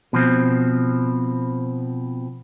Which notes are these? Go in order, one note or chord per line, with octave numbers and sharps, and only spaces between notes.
B2 F3 C4